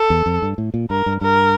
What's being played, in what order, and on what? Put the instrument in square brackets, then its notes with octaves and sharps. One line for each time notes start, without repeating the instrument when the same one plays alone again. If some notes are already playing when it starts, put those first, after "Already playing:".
Already playing: [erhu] A4
[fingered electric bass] E2
F2
G2
A2
A#2
[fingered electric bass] G2 [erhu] A#4
[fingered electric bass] G2
[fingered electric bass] G2 [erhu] A#4